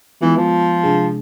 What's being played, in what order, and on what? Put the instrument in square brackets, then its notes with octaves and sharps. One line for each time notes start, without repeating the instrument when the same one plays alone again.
[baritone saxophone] E3 [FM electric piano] G#3 B3 F4
[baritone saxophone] F3
[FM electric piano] C3 G#3 D4 G#4